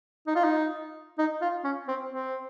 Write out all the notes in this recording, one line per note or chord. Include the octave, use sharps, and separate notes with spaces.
D#4
F4
D#4
D#4
F4
C#4
C4
C4